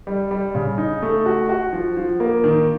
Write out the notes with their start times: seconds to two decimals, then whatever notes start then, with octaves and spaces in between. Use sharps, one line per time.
0.07 G3
0.31 G3
0.55 C#3
0.78 D#4
1.02 A3
1.26 F#4
1.49 F#4
1.73 F3
1.97 F3
2.20 A#3
2.44 D#3